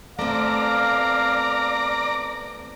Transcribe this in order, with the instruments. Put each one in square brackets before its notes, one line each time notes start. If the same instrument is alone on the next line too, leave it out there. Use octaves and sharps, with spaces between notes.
[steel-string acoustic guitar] A3 B3 C4 [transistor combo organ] D5 A#5 [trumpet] F5